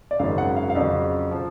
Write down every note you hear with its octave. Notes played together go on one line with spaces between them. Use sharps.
D5
G#1 F#2 C#3 F5
F#5
F5
F5
F2 C#3 F#3 D5
F3